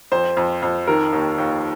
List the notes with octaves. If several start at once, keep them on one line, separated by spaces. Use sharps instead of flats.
F2 C5
F2
F2
D#3 A#4
D#2
D#2